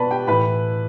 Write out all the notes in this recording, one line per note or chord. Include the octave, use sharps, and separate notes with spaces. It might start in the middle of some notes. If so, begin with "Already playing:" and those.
Already playing: B2 B4 D5 A5 B5
G4 G5
A2 E3 B4 B5